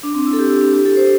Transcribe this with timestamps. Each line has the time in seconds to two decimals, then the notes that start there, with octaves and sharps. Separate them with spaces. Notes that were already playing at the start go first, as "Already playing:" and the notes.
0.03 D4
0.15 C4
0.26 E4
0.33 A4
0.39 G4
0.50 E4
0.61 D4
0.73 G4
0.85 A4
0.96 C5